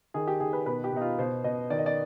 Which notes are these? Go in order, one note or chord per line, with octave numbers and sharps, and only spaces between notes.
D#3 G#4
G4
D#3 G#4
B4
B2 B4
G4
B2 D#4
F4
B2 C5
B2 D#5
D#3 D5
D#5
D5